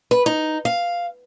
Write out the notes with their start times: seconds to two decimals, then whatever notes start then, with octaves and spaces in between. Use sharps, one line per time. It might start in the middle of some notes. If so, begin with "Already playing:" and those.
0.11 B4
0.26 D#4
0.65 F5